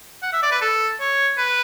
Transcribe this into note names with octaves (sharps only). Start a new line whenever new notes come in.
F#5
E5
D5
B4
A4
C#5
B4